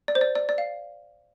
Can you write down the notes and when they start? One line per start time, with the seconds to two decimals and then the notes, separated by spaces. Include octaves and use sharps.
0.08 D5
0.15 C5
0.21 D5
0.35 D5
0.49 D5
0.58 F5